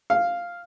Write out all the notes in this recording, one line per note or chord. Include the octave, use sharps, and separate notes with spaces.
F5